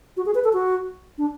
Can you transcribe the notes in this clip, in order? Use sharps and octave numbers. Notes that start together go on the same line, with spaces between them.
F#4
G#4
B4
A4
F#4
D4